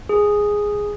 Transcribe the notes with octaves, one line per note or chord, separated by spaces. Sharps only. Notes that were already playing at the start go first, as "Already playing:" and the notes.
G#4